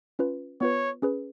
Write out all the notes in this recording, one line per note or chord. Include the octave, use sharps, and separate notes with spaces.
C#4 F4 B4
B3 F4 B4 C#5
C#4 G#4 B4